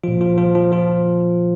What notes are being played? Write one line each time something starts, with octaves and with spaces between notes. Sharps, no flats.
A#2 F3 F4
F3 F4
F3 F4
F3 F4
F3 F4